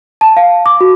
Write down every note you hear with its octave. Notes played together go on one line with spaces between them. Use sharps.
A5
F5
D6
F#4